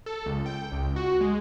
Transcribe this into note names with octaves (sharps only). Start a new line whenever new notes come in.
A4
C#2
G5
C#2
F#4
G#3